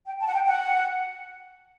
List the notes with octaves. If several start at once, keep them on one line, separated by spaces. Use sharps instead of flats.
G5
A5
F#5
G5
F#5